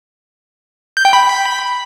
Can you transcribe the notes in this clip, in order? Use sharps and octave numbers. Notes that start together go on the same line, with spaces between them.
G6
G5
B5